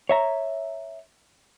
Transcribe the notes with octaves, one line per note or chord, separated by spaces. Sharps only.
C#5 E5 A#5